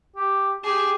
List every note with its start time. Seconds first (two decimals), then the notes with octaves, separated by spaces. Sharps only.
0.16 G4
0.64 G4 G#4